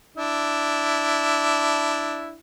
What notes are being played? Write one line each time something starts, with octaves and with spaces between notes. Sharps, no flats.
D4 E4